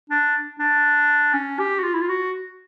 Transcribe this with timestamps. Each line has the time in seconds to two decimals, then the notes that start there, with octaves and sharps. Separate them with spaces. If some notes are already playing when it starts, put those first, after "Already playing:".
0.10 D4
0.59 D4
1.33 C#4
1.59 G4
1.79 F#4
1.83 F4
1.94 E4
2.01 F4
2.09 F#4